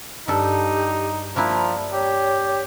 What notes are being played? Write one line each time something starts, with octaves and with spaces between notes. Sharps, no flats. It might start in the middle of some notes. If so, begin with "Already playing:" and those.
G2 D#4 G4 A4
F3 A#3 D4 E4 A#5
G4 C#5